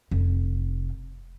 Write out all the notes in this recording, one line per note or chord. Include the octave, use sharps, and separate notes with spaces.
F1